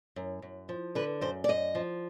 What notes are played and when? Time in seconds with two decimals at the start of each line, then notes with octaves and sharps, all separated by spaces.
0.16 F#2
0.42 F#2
0.69 F3
0.95 D3 B4
1.21 F#2 C5
1.44 D5
1.48 F#2 D#5
1.75 F3